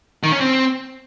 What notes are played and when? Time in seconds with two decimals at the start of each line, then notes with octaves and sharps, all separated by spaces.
0.23 D#3
0.32 C#4
0.41 C4